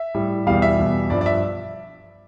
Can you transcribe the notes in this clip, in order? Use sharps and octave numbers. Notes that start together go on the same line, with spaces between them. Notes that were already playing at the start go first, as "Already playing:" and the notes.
Already playing: E5
A2 G3
E2 B2 G3 F5
E5
E2 B2 G3
G2 F3 D5
D5
E5